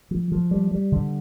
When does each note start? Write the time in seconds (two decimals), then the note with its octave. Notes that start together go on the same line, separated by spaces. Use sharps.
0.11 F3
0.32 F3
0.51 G3
0.71 G3
0.92 D3